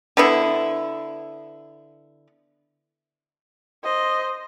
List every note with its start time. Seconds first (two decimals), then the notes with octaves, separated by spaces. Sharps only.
0.17 D3 B3 E4
3.84 C5 D#5